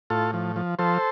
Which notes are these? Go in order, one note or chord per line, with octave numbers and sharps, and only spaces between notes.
A2 F4 A4
F3
F3
F3 A4 C5